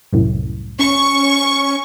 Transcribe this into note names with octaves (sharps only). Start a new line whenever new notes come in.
C2 F#2 A2
C#4 C#6